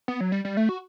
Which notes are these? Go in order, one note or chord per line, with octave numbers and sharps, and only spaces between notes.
B3
F#3
G3
G3
A3
F#4